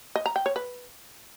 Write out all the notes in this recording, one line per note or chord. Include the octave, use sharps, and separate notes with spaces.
D#5
A#5
G5
C#5
B4